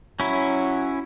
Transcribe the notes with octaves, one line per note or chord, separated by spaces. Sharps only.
F#3 C#4 E4